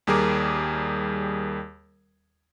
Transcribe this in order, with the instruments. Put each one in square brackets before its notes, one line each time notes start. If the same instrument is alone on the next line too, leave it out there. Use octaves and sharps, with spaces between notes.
[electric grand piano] D#2 G3 G#4 A#4 D6